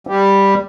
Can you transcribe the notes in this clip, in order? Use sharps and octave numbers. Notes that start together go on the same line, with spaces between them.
G3